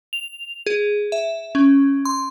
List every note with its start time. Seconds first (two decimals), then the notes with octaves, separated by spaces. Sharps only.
0.13 F7
0.66 G#4
1.12 E5
1.55 C#4
2.05 C6